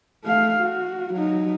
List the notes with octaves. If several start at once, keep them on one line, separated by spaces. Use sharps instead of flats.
A3 F5
F#4
F#3 D#4